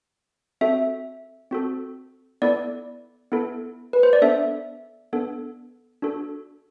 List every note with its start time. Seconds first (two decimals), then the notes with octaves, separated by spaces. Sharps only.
0.61 C4 F#4 A4 E5
1.51 C4 F#4 A4
2.42 B3 E4 A4 D5
3.32 B3 E4 A4
3.93 B4
4.03 C5
4.13 D5
4.22 B3 D4 A4 E5
5.13 B3 D4 A4
6.02 D4 F#4 A4